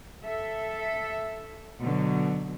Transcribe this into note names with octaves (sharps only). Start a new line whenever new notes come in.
A4 E5
B2 D3 F#3